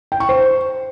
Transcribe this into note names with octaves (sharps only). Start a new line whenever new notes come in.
G5
C#6
C5